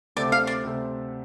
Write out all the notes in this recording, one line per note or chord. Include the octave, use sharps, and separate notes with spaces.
D2 C3 A3 C4 A4 D5
F5
D5
D2 C3 A3 C4 A4